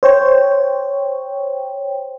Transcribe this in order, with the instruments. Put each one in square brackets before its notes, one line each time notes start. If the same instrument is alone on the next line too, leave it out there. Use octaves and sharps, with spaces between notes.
[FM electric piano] C5 C#5 G5